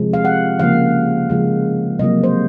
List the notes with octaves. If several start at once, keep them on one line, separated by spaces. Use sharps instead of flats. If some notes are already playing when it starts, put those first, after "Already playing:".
Already playing: C3 F3 G#3
F5
F#5
C#3 F3 A#3 F5
C#3 F3 G#3
C3 F#3 A#3 D#5
C5